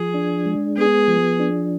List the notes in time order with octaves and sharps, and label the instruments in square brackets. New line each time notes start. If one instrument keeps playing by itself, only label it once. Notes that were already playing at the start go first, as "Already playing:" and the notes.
Already playing: [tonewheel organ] F3 [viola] G#4
[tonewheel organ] D4
G#3
[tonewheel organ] B3 [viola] G#4
[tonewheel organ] F3
D4